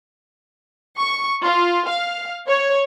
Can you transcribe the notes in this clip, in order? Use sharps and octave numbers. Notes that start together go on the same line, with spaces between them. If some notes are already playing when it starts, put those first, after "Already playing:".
C#6
F4
F5
C#5